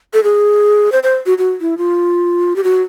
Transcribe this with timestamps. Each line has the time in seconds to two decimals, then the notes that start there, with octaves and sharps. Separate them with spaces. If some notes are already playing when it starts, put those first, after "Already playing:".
0.14 A4
0.24 G#4
0.92 C5
1.03 C5
1.26 F#4
1.38 F#4
1.61 E4
1.78 F4
2.56 G4
2.64 F#4